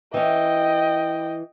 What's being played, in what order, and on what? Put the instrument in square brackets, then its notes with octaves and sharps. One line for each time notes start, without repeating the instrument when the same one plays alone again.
[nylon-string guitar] E3 C#4 [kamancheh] D#5 G5